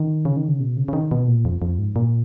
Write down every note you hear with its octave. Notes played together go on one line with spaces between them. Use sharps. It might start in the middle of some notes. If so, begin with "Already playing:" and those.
Already playing: D#3
C#3
D#3
C#3
B2
C#3
C#3
D#3
B2
A#2
F2
F2
G#2
A#2